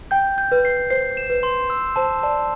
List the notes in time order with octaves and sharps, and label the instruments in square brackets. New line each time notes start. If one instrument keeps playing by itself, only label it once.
[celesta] G5 [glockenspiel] G6
[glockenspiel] G6
[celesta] B4
[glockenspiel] C7
[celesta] C5 [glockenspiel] C7
[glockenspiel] E7
[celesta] B4
[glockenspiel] C6
E6
[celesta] C5 [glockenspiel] A5
[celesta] D5 [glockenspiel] A5